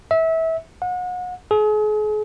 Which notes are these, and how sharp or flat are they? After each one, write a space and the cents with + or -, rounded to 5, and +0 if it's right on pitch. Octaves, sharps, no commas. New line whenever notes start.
E5 -25
F#5 -35
G#4 +40